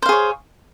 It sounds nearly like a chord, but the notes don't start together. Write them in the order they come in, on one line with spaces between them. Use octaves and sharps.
C5 F5 G#4 C#5